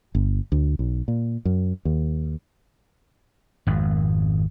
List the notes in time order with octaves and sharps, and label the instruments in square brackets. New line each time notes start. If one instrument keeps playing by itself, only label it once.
[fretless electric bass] G1
D2
B1
A#2
F#2
D#2
[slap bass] G#1 F2